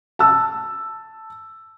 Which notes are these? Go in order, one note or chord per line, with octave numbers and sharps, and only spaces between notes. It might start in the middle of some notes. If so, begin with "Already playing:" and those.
A5 E6